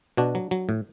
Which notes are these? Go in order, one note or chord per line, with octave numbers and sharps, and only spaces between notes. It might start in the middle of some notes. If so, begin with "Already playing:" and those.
B2 D4 F#4
F#3
F#3
A2